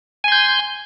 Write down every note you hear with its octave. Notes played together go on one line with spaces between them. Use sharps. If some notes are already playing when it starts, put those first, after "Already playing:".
G#5 C6 G6